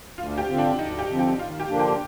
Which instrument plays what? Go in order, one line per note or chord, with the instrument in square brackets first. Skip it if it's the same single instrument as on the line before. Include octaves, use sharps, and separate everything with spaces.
[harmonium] D2 [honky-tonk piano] F4
[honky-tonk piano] G4
[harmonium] D3 F3 C4
[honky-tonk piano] D4
[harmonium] D2 [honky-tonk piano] D#4
[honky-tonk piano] G4
[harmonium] D3 F3 C4
[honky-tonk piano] G4
[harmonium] D#2 [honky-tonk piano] F4
[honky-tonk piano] G4
[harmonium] D3 F3 A#3 D4
[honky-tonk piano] G4